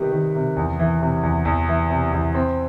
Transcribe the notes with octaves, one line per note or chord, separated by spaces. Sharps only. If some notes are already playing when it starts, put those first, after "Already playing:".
Already playing: C3 D#3 G3 B3
D#3
C3
E2
E3
C3
E2
E2
E3
C3
E2
C4